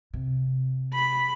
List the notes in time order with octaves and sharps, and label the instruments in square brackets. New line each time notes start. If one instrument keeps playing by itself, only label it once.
[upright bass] C3
[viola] B5